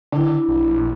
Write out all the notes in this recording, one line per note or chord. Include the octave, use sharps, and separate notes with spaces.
D3 D4 E4
A#1